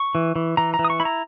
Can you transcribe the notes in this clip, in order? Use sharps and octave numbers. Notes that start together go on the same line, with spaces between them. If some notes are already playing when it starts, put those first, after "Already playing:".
Already playing: C#6
E3
E3
E3 A#5
A#5
E3
D#6
C#6
E4 B5
A#5